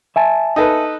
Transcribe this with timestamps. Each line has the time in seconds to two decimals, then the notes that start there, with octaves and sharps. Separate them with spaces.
0.16 E5 G#5 A5
0.56 D#4 A4 B4